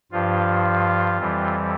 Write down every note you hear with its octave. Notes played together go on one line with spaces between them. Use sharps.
G2 F3 F4
F2 E3 G3